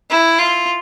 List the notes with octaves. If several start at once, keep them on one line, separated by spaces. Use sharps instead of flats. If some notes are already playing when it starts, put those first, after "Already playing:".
E4
F4